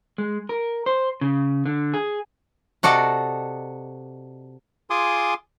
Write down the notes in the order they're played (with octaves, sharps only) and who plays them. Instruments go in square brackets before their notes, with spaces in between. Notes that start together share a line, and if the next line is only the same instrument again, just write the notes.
[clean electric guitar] G#3
A#4
C5
C#3
D3
G#4
[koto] C3 F#4 A4 D5 D#5
[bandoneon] F4 G#4 G#5 C6 D6 D#6